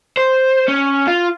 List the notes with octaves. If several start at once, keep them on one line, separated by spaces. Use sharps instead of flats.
C5
C#4
F4